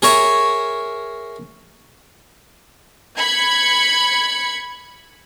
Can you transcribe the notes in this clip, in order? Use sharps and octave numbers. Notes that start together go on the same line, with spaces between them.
G#4 A#4 C#5 E5
B5 G#6 C#7